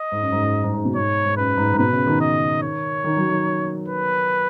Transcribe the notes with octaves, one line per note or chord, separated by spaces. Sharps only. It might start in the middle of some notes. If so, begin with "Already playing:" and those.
Already playing: D#5
G#2
F#2
G#2
G#2
G#2
G#2
B2
G#2 C#5
G#2
F#2 B4
G#2
G#2
B2 B4
C#3
D#3
D#5
C#5
D#3
F#3
D#3
B4